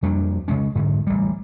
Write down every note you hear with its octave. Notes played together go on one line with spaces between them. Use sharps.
F2 G3 A#3 D4
C#3 G#3 C#4
G#2 D3
A1 G3